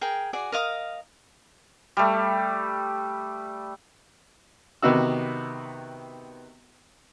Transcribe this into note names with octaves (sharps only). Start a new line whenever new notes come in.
G#4 A#4 G5
F#4 G#4 D5
A#4 D#5 F5 D#6
G3 A3
C3 D#3 B3 D#4 F#4 E6